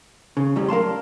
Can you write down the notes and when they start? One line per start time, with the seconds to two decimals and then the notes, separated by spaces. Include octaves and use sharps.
0.37 C#3
0.56 F2 A2 F#3 G3
0.69 A#4 F5 A5 C6